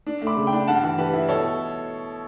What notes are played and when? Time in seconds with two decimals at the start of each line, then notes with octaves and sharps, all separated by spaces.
0.07 D4
0.22 A3
0.27 B5 D6
0.37 C#3
0.47 G5 B5
0.53 D4
0.68 G2 F#5 A5
0.83 E3
0.98 E3 G4 B4
1.14 E4
1.29 B2 A4 C#5